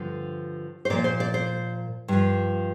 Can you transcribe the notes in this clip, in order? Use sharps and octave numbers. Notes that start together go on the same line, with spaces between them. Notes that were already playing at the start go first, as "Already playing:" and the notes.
Already playing: G2 D3 F3
C5
A#2 F3 D5
C5
D5
C5
G2 F3